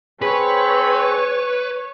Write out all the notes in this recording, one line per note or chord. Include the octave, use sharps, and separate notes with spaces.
C4 G#4 B4 C#5